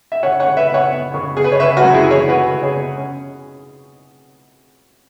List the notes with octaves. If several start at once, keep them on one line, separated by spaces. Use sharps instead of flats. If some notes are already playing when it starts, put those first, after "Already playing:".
E5
C#3 C#5 F#5
C#5 F#5
C#3
B4 E5
B3
C#5 F#5
B3
C#3
B3 G#4
B4
C#5
C#3 B4 E5
F#4 B4
F#2
E4 G#4
E3 G#4 C#5
B3 F#4 B4
C#3
G#4 C#5
B3
C#4